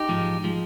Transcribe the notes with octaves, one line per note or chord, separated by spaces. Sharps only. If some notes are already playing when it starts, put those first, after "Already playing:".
Already playing: D#4 G4
G#2 F3 G#3
F3 G#3